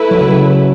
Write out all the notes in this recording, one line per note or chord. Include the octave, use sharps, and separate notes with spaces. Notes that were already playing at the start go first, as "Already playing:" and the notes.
Already playing: A3 E4 B4
F#3
C#3